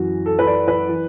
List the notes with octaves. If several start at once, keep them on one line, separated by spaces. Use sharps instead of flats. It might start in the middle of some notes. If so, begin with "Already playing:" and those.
Already playing: F#2 E3 F#4
A4
B4
D5
B4
E3